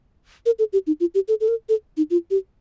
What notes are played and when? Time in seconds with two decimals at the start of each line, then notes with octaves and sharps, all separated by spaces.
0.46 A#4
0.59 A4
0.73 G4
0.87 D#4
1.00 F4
1.15 G4
1.28 A4
1.41 A4
1.48 A#4
1.69 A4
1.97 D#4
2.10 F4
2.31 G4